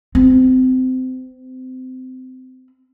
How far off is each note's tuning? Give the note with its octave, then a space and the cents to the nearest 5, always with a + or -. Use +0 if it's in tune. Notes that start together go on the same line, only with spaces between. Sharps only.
C4 -30